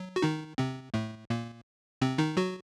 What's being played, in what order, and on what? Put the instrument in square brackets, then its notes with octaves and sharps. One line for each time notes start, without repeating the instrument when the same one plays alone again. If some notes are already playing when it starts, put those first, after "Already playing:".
Already playing: [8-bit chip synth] F#3
F#4
D#3 D#4
C3 C4
A2 A3
A#2 A#3
C3 C4
D#3 D#4
F#3 F#4